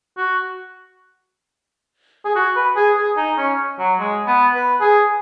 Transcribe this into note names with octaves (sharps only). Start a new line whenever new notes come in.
F#4
G#4
F#4
B4
G#4
G#4
D#4
C#4
F#3
G#3
B3
B4
G#4